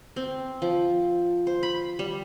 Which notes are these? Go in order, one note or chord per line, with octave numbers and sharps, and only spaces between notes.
C4
F3
C5
B5
G3